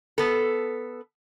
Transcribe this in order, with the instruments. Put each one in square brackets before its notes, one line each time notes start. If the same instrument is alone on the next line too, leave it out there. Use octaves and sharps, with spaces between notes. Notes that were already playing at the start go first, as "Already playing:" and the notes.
[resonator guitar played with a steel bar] B3 A4